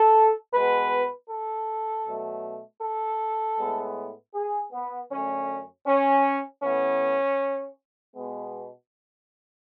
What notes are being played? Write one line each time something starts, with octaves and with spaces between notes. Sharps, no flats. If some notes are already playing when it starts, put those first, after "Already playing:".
Already playing: A4
B2 G#3 B3 B4
A4
B2 F#3 A3
A4
A2 G#3 B3
G#4
B3
F#2 D3 A3 C#4
C#4
A2 E3 B3 C#4
B2 G#3 B3